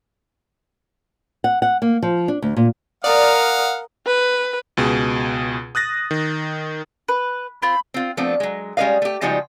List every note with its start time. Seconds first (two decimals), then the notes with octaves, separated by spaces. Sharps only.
1.44 F#5
1.62 F#5
1.82 A#3
2.03 F3
2.28 D4
2.42 D2
2.57 A#2
3.04 A#4 D5 F5 F#5 D#6
4.06 B4
4.77 C#2 B2 G#4
5.75 D#6 F#6 A6 A#6
6.11 D#3
7.08 B4
7.62 C4 F4 B5
7.94 C4 F4
8.17 F3 A3 B3 C4 D4
8.40 F#3 G#3
8.77 G3 G#3 C#4 B4 D#5 F5
9.02 A3 G4
9.21 C#3 F3 G3 G#3 D#4 F#4